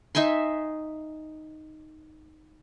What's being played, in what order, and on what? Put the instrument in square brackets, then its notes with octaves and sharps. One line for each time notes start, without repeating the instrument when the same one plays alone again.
[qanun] D#4 E5 G#5 C6